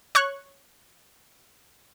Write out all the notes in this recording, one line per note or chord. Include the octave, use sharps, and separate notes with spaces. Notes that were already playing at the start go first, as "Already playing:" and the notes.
C#5 C#6 F#6